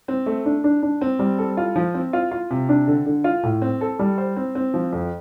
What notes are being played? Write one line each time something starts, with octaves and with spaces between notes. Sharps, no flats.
C4
A3
D4
D4
D4
C4
G3
A4
F4
F3
C4
F4
F4
C3
D4
D3
D3
F4
A2
C4
A4
G3
C5
C4
C4
F3
F2